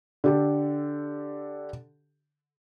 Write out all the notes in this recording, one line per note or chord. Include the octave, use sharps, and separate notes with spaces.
D3 G4 A4